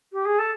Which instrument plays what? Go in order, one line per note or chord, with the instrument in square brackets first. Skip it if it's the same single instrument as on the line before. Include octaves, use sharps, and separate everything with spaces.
[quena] G4
G#4
A4